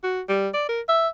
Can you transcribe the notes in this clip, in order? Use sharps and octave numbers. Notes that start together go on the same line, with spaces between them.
F#4
G3
D5
A#4
E5